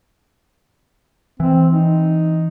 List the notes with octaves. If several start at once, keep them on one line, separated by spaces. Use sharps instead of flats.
E3 C4
D#4